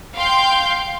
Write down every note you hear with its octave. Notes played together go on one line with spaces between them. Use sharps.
F5 G5 C6 G6